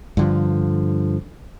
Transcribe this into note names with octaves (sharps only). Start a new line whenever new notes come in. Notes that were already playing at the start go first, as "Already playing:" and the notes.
G2 D3 F3